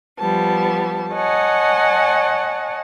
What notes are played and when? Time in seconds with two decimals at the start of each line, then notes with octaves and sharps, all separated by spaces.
0.19 F3 G3 B3 A5
1.14 C#5 D#5 F#5 G#5 A5